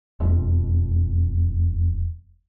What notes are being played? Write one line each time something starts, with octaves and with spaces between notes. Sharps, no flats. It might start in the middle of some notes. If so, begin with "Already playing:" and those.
E1 F2 B2